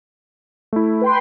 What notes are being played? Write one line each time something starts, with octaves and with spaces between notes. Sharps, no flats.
A3 E4
B4 G5 C6